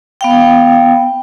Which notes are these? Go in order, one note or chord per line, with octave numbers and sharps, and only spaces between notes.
B3 F5 G5